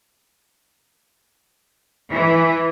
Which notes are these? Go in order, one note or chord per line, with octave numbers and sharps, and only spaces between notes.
E3